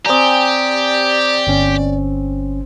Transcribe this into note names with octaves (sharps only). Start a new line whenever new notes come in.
C4 G4 D5 G#5 A#5 D#6
G1 C#4